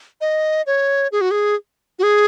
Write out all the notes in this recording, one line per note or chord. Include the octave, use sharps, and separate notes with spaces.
D#5
C#5
G#4
F#4
G#4
F#4
G#4